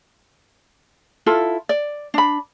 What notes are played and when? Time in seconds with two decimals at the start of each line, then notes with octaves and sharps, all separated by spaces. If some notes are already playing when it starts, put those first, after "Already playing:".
1.26 E4 F4 A4
1.69 D5
2.14 D4 B5